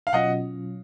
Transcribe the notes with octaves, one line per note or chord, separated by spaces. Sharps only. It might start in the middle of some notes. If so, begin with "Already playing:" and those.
F5
B2 F#3 C#4 F4 D#5 F#5